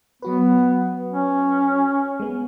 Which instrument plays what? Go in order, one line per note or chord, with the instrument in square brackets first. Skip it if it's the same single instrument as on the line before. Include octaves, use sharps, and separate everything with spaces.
[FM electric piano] F#3 F#4 B4 [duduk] B3
[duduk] C#4
[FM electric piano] G#3 B3